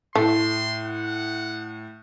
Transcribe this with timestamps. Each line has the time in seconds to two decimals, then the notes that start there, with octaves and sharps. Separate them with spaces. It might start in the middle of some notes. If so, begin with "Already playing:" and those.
0.15 A2 A3 C6
0.85 F#5